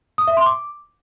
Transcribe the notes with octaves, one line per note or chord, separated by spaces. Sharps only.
D#6
E5
C6
D6